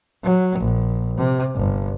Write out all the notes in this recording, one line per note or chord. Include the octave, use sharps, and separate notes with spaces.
F#3
A#1
C3
G1